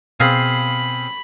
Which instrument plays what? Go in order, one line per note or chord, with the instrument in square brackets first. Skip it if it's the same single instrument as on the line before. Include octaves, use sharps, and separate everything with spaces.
[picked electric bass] B2 [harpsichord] C4 G#4 F5 [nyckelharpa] B5